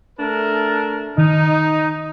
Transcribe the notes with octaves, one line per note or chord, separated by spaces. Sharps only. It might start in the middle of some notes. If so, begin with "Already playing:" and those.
A3 D4 A#4
D#3 D#4